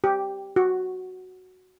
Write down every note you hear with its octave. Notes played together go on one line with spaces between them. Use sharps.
G4
F#4